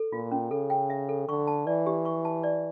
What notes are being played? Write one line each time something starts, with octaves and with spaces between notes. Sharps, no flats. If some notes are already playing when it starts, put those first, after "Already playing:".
Already playing: A4
A#2 F4
C#4
C#3 A4
G5
E5
A4
D3 C#6
A5
E3 D5
G4
C#6
A5
D5